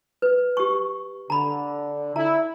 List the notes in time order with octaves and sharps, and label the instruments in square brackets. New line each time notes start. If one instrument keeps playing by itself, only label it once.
[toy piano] B4
G4 C#6
[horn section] D3 [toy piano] A#5 B5
[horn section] E4 [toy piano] A#5